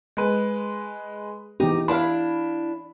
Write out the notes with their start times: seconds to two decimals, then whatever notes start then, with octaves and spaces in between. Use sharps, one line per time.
0.17 G#3 B4
1.60 E3 B3 D#4 G4
1.88 D4 E4 F5 B5